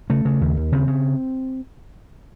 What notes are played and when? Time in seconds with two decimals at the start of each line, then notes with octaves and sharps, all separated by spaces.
0.10 C#3 A3
0.25 C#3
0.41 D#2
0.57 D#2
0.72 C#3 C4
0.87 C#3